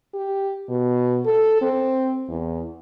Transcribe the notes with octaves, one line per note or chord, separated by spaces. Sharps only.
G4
B2
A4
C4
E2